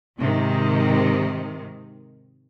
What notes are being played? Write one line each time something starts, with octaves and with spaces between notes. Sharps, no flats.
G#2 C3 D#3